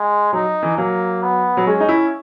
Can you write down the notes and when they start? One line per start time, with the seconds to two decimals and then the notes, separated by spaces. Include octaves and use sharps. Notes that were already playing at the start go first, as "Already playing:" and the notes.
Already playing: G#3
0.33 F#3 D#4
0.63 E3
0.77 F#3 A#3
1.23 B3
1.57 F#3
1.67 G#3 C#4
1.80 D#4
1.89 E4